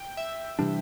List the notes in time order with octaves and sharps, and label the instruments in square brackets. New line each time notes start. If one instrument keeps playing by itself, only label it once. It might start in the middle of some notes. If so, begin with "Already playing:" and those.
Already playing: [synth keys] G5
E5
[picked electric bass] C3 E3 G3 D4